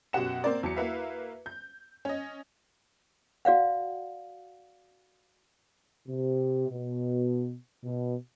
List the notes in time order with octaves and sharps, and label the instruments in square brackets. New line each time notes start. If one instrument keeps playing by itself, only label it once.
[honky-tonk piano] F#2 B2 G4 F#5 E7
A#3 C4 A#4 D5
E2 F#3 C#7
A#3 E4 F#4 B4 E5 F5
G6
C#4 D#5
[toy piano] F#4 D5 F5 F#5
[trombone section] C3
B2
B2